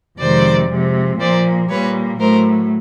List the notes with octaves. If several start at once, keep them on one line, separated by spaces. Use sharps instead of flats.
F2 C3 D#3 G#3 C5 D5
C3 F3 G#3
A#2 F3 A#3 C5 D5
A#2 G3 A#3 B4 C#5
A2 F#3 A3 A#4 C5